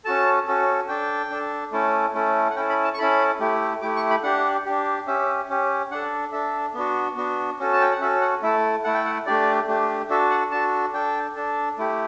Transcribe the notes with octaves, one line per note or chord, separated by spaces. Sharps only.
C#4 F#4 A4 A5
C#4 F#4 A4
D4 A4 G5
D4 A4
A3 C#4 E4 A4
A3 C#4 E4 A4
F#5
C#4 E4 A4 G5
B5
A5
C#6
C#4 E4 A4 B5
A3 E4 G4
A3 E4 G4 D6
C#6
B5
D4 G4 F#5
D4 G4
C#4 G4 E5
C#4 G4
D4 A4 F#5
D4 A4 E5
B3 D4 F#4
B3 D4 F#4
C#4 F#4 A4
A5
G5
F#5
C#4 F#4 A4 E5
F#5
A3 E4 A4 E5
A3 E4 A4 F#5
G5
F#5
A3 D4 G4 D5
A3 D4 G4
D4 F#4 A4 E5
F#5
D4 F#4 A4 A5
D4 A4 G5
D4 A4
A3 E4 G4